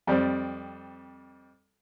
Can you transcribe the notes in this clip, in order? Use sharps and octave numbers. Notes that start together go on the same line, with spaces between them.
F2 G3 C4